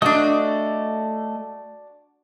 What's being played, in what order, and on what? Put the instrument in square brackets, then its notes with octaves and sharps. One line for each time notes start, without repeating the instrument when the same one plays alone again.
[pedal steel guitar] A3 D#5 D#6 [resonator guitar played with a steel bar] D4 F#4